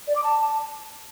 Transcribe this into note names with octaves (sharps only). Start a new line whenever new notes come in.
D5
D6
A5